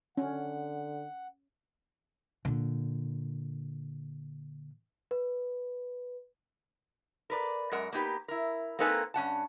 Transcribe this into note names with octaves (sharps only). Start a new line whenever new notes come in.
D3 C#4 F#5
A#2 D3
B4
A#4 B4 D5
F#2 G#3 A#4 F#5
A#3 B3 D#4 G4 B4
E4 A#4
A#3 C4 D#4 A4 B4 G#5
G2 C#4 F#5 A5